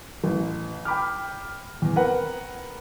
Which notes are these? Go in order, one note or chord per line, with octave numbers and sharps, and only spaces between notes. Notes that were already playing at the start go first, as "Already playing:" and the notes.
A1
G5 B5 D6 F6
E2
C4 A#4 B4 F#5